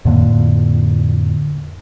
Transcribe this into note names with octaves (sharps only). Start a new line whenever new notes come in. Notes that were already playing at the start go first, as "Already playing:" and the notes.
F2 A2 D3 A#3